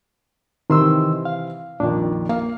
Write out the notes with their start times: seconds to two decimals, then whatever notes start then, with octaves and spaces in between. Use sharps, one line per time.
0.70 C3 D#3 E3 C4 C6 E6
1.25 F5
1.80 A#1 F2 D#3 D4
2.29 A#3 F5